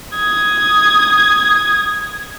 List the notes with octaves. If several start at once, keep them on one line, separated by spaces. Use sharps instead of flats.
D#6 G#6